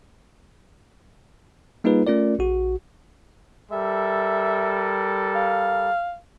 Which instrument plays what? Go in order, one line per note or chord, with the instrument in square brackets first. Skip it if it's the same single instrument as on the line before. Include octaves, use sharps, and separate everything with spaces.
[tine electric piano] G3 A#3 D#4 F4 G#4 B4
A3 C#4 F4 A#4 D5
A#1 F#4
[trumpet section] G3 A4 A#4 [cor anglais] E5
[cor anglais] F5